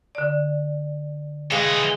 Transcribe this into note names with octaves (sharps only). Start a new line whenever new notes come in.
D3 D5
E3 G#3 D#5 F5